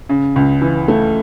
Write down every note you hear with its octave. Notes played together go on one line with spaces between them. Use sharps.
C#3
C#2
E3
A3